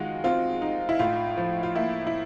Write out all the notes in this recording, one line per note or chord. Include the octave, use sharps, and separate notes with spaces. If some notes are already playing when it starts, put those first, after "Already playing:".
Already playing: D#3 G#3 F4 F#4
C4 F4
D#4
E4
A2 F4
F3
F4
A#3 E4
E4